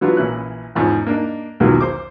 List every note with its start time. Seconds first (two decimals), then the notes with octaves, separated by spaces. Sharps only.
0.01 E3 F#3 B3 D4 F4
0.17 A#1 E3 C#4 E4 F#6
0.75 E2 G#2 F3 C#4
1.06 A#3 D4 D#4
1.60 B1 E2 D#3 F#3 A#3 F4
1.80 C5 D6